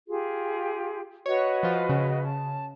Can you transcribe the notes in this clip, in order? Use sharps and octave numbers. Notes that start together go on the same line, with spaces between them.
F4 G4 G#4
F#4 B4 C#5 D#5
F3 F4
C#3
A5